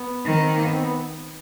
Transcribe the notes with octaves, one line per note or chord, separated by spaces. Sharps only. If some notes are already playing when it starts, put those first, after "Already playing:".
Already playing: B3
D#3 C4
B3
C4
A#3
B3
C4
B3